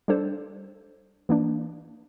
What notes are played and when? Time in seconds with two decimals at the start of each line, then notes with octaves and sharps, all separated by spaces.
0.08 G3 D4 A4 C5
1.29 E3 A#3 D4